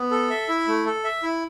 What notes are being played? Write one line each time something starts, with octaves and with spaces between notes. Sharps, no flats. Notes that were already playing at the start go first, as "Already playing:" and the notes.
Already playing: B3
A4
E5
E4
A3
A4
E5
E4